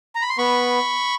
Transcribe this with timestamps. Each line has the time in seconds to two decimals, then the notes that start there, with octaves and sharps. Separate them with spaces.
0.15 A#5
0.22 B5
0.30 C6
0.38 B3 B5 C#6